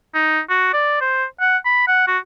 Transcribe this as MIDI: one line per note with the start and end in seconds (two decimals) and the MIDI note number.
0.15 0.40 63
0.50 0.70 66
0.73 1.01 74
1.01 1.25 72
1.40 1.58 78
1.65 1.88 83
1.88 2.07 78
2.07 2.18 66